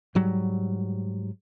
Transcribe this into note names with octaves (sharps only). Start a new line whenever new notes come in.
G#2 F#3 G3